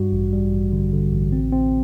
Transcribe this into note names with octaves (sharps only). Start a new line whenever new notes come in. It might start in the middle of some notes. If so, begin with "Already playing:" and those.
Already playing: G2 G3 F#4
A1
G3
A1
D3
D3
A1
C4
C4